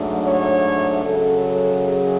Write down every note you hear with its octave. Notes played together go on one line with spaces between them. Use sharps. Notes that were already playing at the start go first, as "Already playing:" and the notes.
Already playing: G#2 F#3 A3 D4
C#5
F#2 C#3 F#3 A4
G#4